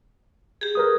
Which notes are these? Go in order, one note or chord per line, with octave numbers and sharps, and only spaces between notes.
G4 G#4
A#4 B4 D#6